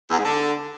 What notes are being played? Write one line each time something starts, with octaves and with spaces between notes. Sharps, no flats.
E2
G#2
D3